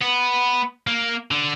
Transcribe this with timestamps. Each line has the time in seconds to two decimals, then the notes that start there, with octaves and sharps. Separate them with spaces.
0.01 B3
0.87 A#3
1.31 D3